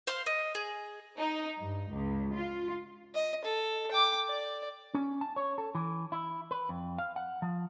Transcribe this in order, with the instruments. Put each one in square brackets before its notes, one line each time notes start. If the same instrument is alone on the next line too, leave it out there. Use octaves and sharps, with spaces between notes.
[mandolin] C5 F5 C6
D#5
G#4
[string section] D#4
G2
C#2
F4
[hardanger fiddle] D#5
A4
G5 D6
D5
[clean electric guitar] C#4
A5
C#5
A4
E3
E4
B4
F2
F5
F#5
F3